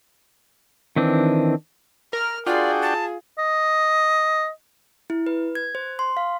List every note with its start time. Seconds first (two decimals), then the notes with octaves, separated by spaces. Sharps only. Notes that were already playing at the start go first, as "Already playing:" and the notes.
0.96 D#3 E3 C4 D4
2.13 A#4 F6
2.47 D4 F4 F#4 G#4 D5 G5
2.82 A5
3.38 D#5
5.10 E4
5.27 B4
5.55 G#6
5.75 C5
5.99 C6
6.17 F5